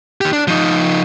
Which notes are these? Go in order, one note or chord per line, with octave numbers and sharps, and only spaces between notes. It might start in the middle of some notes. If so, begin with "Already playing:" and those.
D#3 G4
D4
F3 D#4